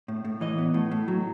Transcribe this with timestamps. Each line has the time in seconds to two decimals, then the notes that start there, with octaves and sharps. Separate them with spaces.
0.08 A2
0.25 A2
0.41 E3 D#5
0.58 B3
0.74 A2
0.91 A2
1.08 F#3